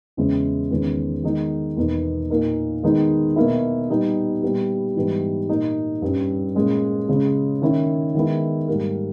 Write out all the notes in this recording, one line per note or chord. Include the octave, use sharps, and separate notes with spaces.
E2 C#3 G#3 C#4 E4
E2 D#3 G#3 C#4
D#3 G#3 B3 D#4
E2 B2 A#3 D#4
A#2 A#3 D#4
D#3 G#3 B3 D#4
B2 A#3 E4
A#2 G3 B3 D#4
A#2 G3 B3 E4
G#2 E3 G3 B3 D#4
A#2 A#3 D#4
G2 G3 C#4
A#2 G#3 C#4
C#3 G#3 C#4
D#3 A#3 C#4 E4
D#3 G#3 B3 E4
G#2 G3 A#3